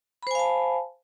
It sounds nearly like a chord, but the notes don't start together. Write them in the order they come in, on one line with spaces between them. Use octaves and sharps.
B5 C5 G#5 F5 A5